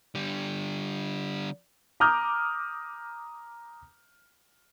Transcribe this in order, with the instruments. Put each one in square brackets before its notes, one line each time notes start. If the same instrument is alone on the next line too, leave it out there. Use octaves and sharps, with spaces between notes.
[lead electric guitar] D3 G3
[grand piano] A#5 D6 D#6 F6 G6